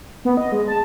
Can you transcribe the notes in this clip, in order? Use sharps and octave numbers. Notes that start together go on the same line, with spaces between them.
B3
D#5
G#3
A5